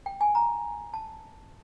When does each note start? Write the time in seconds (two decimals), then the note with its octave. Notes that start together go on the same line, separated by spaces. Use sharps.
0.06 G5
0.21 G#5
0.35 A#5
0.94 A5